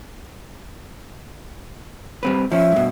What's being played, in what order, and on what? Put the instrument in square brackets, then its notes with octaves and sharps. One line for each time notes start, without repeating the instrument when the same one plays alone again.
[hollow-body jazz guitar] G3 C4 B4
[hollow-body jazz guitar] F3 C#4 [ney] E5
[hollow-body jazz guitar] G2 B2